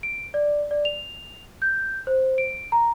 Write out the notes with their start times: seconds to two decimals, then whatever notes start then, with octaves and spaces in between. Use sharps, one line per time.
0.03 D7
0.34 D5
0.71 D5
0.85 F7
1.62 G6
2.07 C5
2.38 D7
2.72 A#5